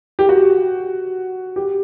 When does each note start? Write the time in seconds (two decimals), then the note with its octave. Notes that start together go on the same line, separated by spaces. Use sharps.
0.19 G4
0.29 F#4
1.56 G4